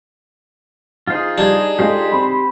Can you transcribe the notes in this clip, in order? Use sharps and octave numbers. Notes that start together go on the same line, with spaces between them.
D#4 F4 G#4 C5
G3 D4 G#6
G#3 F4 G4 A4 C5
C4 B5 C6